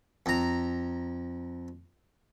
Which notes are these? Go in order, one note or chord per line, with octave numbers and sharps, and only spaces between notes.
F2 A#5